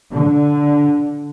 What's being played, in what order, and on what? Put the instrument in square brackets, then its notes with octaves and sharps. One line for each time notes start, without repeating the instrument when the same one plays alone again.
[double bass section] D3